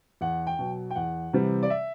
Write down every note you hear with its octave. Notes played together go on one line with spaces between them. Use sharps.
E2 F#5
G5
B2 F#3
G5
E2 F#5
C3 E3 G3 C4
D5
E5